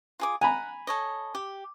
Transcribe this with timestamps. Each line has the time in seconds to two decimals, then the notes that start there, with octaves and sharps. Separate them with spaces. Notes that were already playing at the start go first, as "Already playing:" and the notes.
0.20 F4 G#4 D6
0.41 F#5 G#5 A#5 B5
0.87 A4 C#5 D#5
1.35 G4